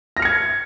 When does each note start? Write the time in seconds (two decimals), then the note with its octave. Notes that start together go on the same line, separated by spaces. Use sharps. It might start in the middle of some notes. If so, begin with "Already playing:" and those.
0.17 A#6
0.19 F6
0.22 C#7
0.25 G#6